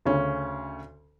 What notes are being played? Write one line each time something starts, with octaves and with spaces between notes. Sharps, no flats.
D2 C#3 C#4